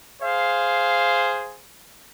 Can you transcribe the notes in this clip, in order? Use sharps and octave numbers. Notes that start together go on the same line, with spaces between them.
G#4 C5 F5